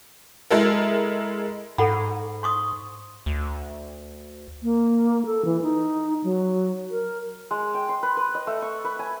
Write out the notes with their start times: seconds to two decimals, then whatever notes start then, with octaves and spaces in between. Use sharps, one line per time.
0.50 G#3 E4 A4 A#4
1.78 G#2 A4 F#5 B5
2.43 C6 C#6 D#6
3.26 D2
4.63 A#3
5.26 A4
5.45 E3
5.62 D#4
6.24 F#3
6.91 A#4
7.51 G#3
7.74 G5
7.89 C6
8.03 B4
8.17 B4
8.35 D#5
8.47 A3
8.62 C#6
8.85 B4
8.99 G#5